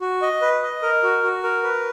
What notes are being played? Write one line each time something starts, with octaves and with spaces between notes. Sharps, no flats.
F#4
D#5
B4
D#5
A#4
F#4
F#4
A#4
B4